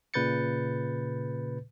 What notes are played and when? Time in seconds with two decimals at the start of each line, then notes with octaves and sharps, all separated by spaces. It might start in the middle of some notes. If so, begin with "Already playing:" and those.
0.14 A#2 C#3 B4 G6 A6 C#7